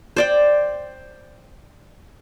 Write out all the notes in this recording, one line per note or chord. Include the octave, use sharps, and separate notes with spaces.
C5 D5 G5